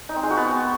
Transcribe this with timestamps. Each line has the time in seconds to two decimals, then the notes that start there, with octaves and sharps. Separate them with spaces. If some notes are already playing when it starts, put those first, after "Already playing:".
0.09 D#4
0.16 C4
0.23 G#3
0.30 F#4
0.37 B3